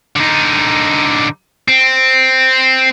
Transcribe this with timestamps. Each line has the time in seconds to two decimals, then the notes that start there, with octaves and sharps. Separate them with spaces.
0.16 D3 D#4
1.68 C4